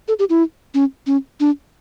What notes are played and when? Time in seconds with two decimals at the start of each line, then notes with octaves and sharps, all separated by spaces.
0.08 A4
0.19 G4
0.30 E4
0.74 C#4
1.06 C#4
1.40 D4